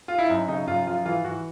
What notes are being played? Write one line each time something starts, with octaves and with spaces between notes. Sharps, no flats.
F4
E4
F#2 D#4
C#3 D#4
F#2 F4
F3 F4
E3 F4
E3 F#4